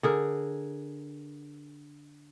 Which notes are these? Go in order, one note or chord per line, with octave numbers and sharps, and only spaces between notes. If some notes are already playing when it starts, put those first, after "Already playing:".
D3 G#4 A#4